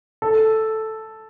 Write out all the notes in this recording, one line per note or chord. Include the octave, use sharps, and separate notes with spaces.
A4